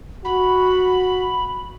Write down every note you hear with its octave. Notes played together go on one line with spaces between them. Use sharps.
F#4 B5